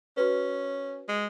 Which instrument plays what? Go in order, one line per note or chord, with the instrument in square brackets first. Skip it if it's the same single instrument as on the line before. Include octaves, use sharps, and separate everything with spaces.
[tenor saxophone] C#4 [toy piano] F#4 B4
[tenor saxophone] G#3